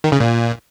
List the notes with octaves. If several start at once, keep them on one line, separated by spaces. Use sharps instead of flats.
D#3
C#3
A#2